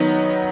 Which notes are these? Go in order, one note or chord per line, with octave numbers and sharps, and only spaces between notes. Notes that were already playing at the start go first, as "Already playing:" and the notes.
Already playing: D#3 F#3 B3 D#4